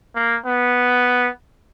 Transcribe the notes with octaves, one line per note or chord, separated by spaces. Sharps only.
A#3
B3